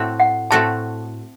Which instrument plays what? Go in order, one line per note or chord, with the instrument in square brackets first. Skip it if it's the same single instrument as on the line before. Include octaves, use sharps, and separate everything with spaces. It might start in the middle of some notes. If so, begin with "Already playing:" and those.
Already playing: [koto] A2 A3 C4 F#4 A4
[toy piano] F#5
[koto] A2 A3 C4 F#4 A4 [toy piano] A5